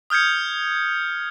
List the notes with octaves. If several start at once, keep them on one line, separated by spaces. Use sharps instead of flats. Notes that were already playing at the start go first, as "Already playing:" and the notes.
D#6 F6 G6 G#6 C#7